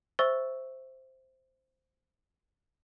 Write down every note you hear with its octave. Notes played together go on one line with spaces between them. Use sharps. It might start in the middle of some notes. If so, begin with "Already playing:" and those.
C5 E5 C#6 E6 A6 G7